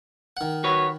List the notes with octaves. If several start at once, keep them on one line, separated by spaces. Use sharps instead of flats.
D#3 F#5
F#4 B4 C#5